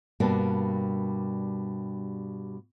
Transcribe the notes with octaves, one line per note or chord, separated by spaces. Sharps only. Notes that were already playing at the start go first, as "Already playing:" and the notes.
G2 B2 G3 A#3 D4